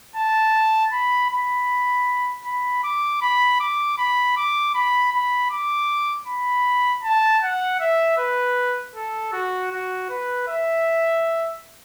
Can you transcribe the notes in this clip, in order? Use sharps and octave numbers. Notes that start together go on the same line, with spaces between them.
A5
B5
B5
B5
D6
B5
D6
B5
D6
B5
B5
D6
B5
A5
F#5
E5
B4
A4
F#4
F#4
B4
E5